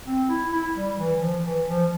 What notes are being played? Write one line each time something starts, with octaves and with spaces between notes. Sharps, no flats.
C4
E4
E4
G3
E3
E3
F3
E3
F3